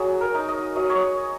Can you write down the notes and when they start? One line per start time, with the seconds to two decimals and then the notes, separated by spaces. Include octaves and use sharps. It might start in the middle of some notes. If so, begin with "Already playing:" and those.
Already playing: F#3 G#4
0.21 A#4
0.35 D#4
0.49 D#5
0.76 F#3 D#5
0.90 C#5